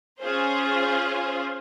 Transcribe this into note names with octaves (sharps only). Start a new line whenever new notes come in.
C#4 F4 G#4 C5